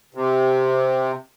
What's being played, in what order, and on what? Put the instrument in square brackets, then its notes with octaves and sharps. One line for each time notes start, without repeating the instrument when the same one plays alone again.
[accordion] C3